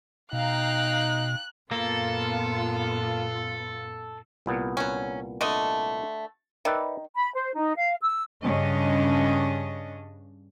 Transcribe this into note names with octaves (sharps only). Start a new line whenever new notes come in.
B2 D#4 F5 G5 A#5 F#6
F#2 A#2 A#3 B3 F4 A4
C2 A#2 B3
F#3 C#4
D3 A3 D#5
D#3 B4 D5 E5
B5
C5
D#4
F5
E6
G2 C#3 C#4 D4 D#5